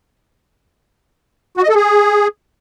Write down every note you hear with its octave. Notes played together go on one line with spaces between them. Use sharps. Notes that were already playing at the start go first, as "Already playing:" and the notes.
F#4
D#5
A4
G#4